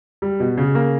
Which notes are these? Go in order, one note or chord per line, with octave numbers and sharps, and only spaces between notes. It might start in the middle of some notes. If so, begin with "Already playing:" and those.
G3
B2
C#3
A#3